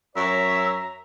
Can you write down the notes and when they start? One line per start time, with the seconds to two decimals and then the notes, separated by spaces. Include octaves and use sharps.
0.16 F#2 C#5 E5 A#5